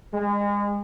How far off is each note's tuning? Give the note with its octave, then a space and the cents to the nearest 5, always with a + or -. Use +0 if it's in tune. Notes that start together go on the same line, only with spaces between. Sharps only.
G#3 -30